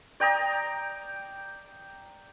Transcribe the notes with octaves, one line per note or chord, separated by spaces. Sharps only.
D5 G5 A#5 D#6